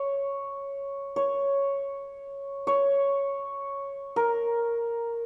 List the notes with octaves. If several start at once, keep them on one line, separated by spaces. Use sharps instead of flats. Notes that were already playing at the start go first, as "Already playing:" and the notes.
Already playing: C#5
C#5
C#5
A#4